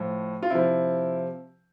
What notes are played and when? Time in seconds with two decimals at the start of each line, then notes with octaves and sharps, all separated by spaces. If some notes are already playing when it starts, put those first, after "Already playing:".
Already playing: A2 F3
0.43 F4
0.50 C3 F3 E4